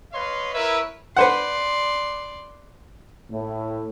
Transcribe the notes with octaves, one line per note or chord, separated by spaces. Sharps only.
B4 C#5 D#5 F5 C6
E4 A#4 B4 C#5 E5
B4 C5 D5 F#5 C6
A2